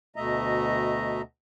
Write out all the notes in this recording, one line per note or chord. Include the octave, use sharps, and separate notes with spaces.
D2 B2 A3 D#5 E5 A#5